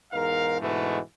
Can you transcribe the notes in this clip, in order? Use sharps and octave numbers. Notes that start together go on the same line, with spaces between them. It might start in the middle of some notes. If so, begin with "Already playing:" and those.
E2 G#2 D#4 A#4 F5
G#2 B2 D3 E3 G#3 A3